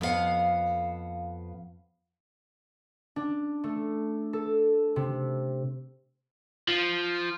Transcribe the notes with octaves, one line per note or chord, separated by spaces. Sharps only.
F2 B3 C#4 F5 F#5
D4
A3
A4
C3
F3